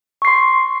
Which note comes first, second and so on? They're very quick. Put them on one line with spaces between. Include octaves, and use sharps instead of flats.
C#6 C7 C6